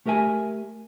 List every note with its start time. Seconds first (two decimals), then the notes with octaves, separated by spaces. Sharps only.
0.06 A3 G4 A#4 E5 G#5